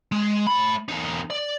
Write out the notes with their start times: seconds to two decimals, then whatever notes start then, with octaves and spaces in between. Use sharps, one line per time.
0.12 G#3
0.47 A3 B5
0.88 E2 D#4
1.30 D5